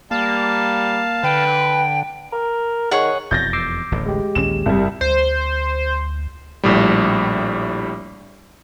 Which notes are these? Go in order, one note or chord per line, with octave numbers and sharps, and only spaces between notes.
G3 A#3 F5 A5
D3 B4 G5
A#4
D#3 G#4 C#5 F#5
E1 F2 B2 G6 A6 A#6
D6 E6 C7
D1 A1 D2
G#3 G4
A#1 D#2 C#4 E7
F#1 C2 G3
D2 C5
A#1 A2 G3